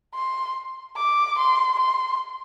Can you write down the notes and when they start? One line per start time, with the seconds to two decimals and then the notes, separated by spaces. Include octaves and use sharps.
0.15 C6
0.97 D6
1.38 C6
1.79 C6